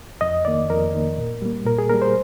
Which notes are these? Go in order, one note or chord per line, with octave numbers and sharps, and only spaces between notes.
F2 D#5
D#3 A#3 D5
F2 A#4
D#3 A#3
A#2
G3 A#3
A#2 A#4
G#4
G3 A#3 A#4
C5